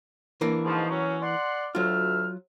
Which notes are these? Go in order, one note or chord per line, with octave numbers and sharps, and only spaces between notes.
E3 A#3 D4
G#2 B2 F3
F#3 C#4
D5 F#5 C6
D2 F#3 F4 E5 F6